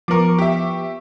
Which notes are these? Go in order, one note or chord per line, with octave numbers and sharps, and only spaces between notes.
F3 B3 A#4 C#6 D6
G4 E5